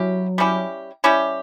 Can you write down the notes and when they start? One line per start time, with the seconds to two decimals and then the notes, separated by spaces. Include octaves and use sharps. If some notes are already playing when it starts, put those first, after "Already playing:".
Already playing: F#3 C#4 E4 G4
0.38 G3 C#4 E4 G4
1.04 G3 C#4 E4 G4